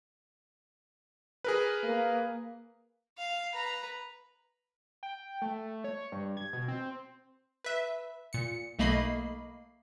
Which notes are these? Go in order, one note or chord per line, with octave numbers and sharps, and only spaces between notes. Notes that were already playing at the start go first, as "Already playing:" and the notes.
G#4 A#4 B4
A#3
F5
B4 A#5
G5
A3
C#5
G2
G#6
B2
C4
B4 E5
A#2 C#7
B1 A3 A#3 D#5 B5 C7